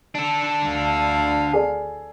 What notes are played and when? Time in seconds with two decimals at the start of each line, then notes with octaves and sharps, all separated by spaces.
0.15 D4 A4
0.65 D2 F5
1.53 G#4 A4 D5